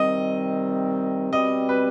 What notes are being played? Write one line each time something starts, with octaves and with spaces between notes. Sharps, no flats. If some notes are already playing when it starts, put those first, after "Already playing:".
Already playing: C3 D#3 G3 C4 D#5
B2 G3 C4 D#5
B4